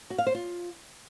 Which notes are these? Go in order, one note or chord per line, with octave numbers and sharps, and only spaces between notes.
F#4
F5
C5
F4